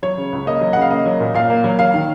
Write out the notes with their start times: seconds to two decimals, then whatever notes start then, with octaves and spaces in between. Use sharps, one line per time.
0.03 F#3 C#5
0.17 C#3
0.33 C#2
0.46 A#3 D#5
0.61 F#3
0.73 C#3 F#5
0.81 F5
0.90 A#3 D#5
1.06 F#3
1.20 A#2
1.34 A#2 F5
1.50 A#3
1.64 F#3
1.79 F#3 F5
1.94 D#3